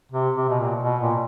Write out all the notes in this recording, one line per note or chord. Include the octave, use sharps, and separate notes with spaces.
C3
C3
B2
A#2
B2
A#2